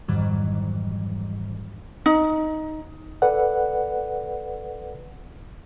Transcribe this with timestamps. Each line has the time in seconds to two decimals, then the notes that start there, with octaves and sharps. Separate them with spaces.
0.08 F2 G#2 D#3 E3 F#3 G3
2.06 D#4
3.22 A4 B4 D5 F#5